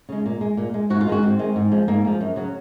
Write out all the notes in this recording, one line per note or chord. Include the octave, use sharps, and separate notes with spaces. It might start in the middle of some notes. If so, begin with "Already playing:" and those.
C#3 G#3
A#2
G#3
A#2
G#3
G#2 F#4
F4
D#3 G#3 F#4
G#2 C4
D#3 G#3
G#2
F3 G#3
G#2 A#3
F3 G#3
F#2
C#3 F#3